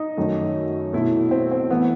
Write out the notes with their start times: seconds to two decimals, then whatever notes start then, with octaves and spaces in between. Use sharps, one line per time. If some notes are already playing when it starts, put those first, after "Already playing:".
Already playing: D#4
0.17 F#2 D#3 A3
0.93 B2 A3 E4
1.31 C4
1.51 C4
1.70 E3 A3 B3